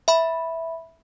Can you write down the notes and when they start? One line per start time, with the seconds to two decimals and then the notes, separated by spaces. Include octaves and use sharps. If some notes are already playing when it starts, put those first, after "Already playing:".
0.08 E5 B5